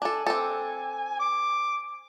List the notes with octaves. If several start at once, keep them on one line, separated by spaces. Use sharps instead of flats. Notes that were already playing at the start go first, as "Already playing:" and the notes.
D4 A4 G#5
C4 D4 A4
D6